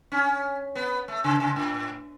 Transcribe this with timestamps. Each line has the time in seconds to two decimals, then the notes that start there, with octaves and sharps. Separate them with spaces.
0.12 C#4
0.75 B3
1.08 A3
1.24 C#3
1.40 C#3
1.56 A2